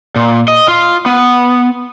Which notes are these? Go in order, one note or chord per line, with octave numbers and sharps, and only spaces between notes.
A#2
D#5
F4
B3